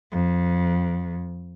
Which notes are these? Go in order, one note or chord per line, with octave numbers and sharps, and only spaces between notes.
F2